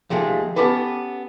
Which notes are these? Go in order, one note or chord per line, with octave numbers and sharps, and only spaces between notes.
D#2 F3 G#3 A3
B3 C#4 G4 A4 B4